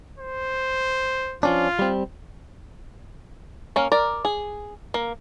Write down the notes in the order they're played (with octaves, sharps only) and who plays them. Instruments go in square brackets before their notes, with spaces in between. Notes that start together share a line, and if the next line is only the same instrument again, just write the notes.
[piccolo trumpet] C5
[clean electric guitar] F3 C#4 D4 [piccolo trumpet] F4
[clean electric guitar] G3 C4
[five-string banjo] A#3 C#4
A#4 D5
G#4
A#3